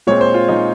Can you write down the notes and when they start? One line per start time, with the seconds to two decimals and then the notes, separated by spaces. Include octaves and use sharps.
0.07 A#2 G#3 C4 C#5
0.21 C5
0.34 F4
0.49 A#2 G#3 C4 D#4